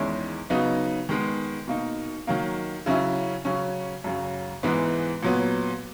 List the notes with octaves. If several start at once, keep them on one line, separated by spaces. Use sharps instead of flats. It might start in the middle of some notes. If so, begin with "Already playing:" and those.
Already playing: E2 D#3 G#3 C#4 E4
C#3 F#3 B3 D#4
D#3 G#3 B3
B2 A#3 D#4
D#3 F#3 A#3
C#3 F#3 C#4 E4
C#3 F#3 C#4
F#2 C#3 F#3
G#2 E3 G#3 B3
A#2 F#3 B3